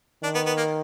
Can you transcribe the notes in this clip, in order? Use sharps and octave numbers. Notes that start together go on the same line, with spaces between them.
D#3 D4
B3
B3
A#3